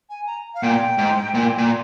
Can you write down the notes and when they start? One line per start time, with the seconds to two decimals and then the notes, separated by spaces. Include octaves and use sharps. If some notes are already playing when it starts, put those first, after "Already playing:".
0.09 G#5
0.27 A#5
0.54 F5
0.63 A#2 G5
0.98 G#2
1.34 A#2
1.58 A#2